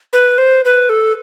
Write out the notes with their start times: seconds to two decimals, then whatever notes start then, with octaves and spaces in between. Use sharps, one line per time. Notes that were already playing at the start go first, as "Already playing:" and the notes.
0.13 B4
0.38 C5
0.65 B4
0.89 A4